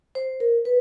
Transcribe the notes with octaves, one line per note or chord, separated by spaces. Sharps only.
C5
A#4
B4